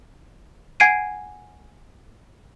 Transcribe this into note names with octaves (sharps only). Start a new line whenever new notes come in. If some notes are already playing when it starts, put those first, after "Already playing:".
F#5 G#5 G#6 C7 D7 D#7